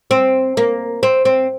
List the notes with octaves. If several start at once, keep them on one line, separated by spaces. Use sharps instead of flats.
C4
A#3
C4
C4